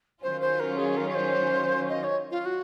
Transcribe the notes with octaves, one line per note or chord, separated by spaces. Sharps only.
D#3 F#3 C#4 F4 C5
C5
A#4
G#4
A#4
C#5
C5
D#5
C#5
F4
F#4